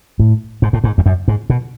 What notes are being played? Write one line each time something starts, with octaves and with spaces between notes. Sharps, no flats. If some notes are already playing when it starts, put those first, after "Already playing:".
A2
G#2
A2
G#2
E2
F#2
G#2
B2